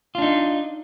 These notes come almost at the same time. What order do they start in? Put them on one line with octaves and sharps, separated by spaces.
F4 D4 D#4